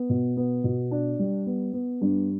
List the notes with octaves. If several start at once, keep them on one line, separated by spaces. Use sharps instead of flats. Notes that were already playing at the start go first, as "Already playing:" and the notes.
Already playing: B3
B2
B3
B2
D4
G3
B3
B3
G2